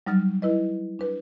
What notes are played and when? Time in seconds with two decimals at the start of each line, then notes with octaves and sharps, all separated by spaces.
0.06 F#3 G3 D#4 F6 A6
0.42 E4 B4 D#5
0.99 D4 B4